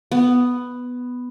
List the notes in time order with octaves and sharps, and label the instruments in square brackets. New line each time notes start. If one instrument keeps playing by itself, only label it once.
[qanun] B3